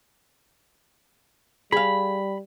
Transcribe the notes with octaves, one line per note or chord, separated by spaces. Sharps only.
G3 G#4 F5 B5